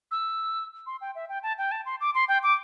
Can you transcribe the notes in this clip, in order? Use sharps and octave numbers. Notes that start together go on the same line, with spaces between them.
E6
C6
G5
E5
G5
A5
G5
A5
C6
D6
C6
G5
D6